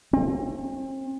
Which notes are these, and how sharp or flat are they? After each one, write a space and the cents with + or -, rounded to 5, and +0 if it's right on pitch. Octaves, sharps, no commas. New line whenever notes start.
C4 +40